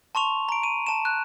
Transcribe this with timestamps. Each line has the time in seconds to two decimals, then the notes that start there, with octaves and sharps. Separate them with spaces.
0.15 A5 C6 C#6 F7
0.49 A#5 D7
0.63 D#7
0.87 A5 E7
1.05 F#6